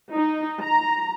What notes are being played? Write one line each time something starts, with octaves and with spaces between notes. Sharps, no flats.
D#4
A#5